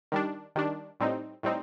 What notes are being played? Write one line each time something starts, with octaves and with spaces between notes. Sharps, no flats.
D#3 G3 D4
D#3 G3 D4
A2 G3 C4 D#4
A2 G3 C4 D#4